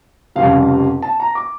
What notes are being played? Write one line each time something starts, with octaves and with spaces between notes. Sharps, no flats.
F1 F2 C#3 G3 F5
A5
A#5
D6